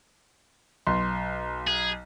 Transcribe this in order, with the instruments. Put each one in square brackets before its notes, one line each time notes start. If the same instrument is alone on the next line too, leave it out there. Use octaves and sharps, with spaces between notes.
[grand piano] B1 [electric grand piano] C6
[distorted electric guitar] G#4